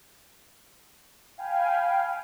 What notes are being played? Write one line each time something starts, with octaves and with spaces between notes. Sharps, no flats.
F5 G5 G#5 B5 F6